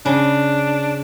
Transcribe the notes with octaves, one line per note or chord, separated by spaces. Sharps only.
C#3 D4